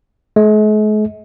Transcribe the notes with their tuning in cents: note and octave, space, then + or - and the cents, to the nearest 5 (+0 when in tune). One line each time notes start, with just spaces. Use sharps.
G#3 +45